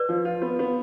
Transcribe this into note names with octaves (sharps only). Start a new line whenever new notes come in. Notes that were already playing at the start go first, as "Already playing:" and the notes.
Already playing: B4 D5
F3
F4
B3
B3